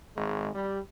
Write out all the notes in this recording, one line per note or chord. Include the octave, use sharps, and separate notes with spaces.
G#1 G#3
G3